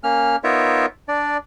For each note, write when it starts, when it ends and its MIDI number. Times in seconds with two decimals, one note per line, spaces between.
0.03 0.36 58
0.03 0.36 61
0.03 0.36 89
0.44 0.86 59
0.44 0.86 63
0.44 0.86 65
0.44 0.86 70
0.44 0.86 73
0.44 0.86 76
1.08 1.37 62
1.08 1.37 74